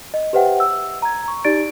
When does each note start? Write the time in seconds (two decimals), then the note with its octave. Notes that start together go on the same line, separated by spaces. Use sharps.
0.14 D#5
0.33 G4 B4 C5 E5 F#5 G5
0.60 E6
1.02 A#5 G#6
1.28 C#6
1.45 D#4 G4 D5 A6 D7